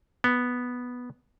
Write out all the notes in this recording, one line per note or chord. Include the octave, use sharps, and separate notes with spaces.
B3